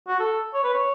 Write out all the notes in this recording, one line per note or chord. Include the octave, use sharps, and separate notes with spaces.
F#4
A4
C#5
B4
C#5